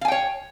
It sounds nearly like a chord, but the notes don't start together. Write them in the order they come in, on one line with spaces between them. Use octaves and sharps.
F5 G#5 G5 C#5